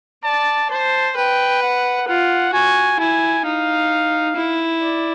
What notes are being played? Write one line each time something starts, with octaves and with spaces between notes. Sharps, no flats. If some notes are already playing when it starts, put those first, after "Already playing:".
D5 A5
C5 A5
B4 G5
F#5
F4 F#5
F#4 G#5
E4 G#5
D#4 F5
E4
D5